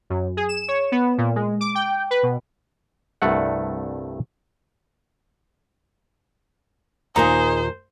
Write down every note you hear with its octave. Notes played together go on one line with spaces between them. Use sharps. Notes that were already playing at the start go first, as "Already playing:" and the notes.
F#2
G#4
E7
C#5
B3
A#2
G#3
D6
G5
B4
B2
C2 G2 A3 F#5
D#2 A#2 D#4 F4 G4 G#4 C5 A#5